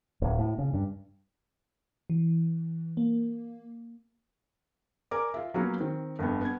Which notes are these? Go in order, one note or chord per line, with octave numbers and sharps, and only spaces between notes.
D1
A2
C#3
G2
E3
A#3
A#4 D5 G#5 D6
F4 E5
F#3 A#3 B3 C#4 F4 F#4
D#3 C4
G1 F2 D3 B3
B3 G#6